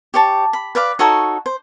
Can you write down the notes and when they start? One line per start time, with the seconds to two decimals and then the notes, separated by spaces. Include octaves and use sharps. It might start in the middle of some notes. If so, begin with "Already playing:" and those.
0.14 G4 C#5 A5
0.53 B5
0.75 B4 D5 F5 D6
0.99 D#4 F#4 A4 C#5
1.46 C5